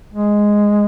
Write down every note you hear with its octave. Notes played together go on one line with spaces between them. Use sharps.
G#3